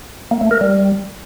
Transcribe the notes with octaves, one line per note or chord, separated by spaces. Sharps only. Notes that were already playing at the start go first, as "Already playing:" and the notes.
A#3
A3
A#4
G3